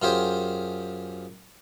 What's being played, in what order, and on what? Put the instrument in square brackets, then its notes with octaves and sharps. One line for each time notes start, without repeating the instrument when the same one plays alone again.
[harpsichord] F#2 F4 G4 G#4 C5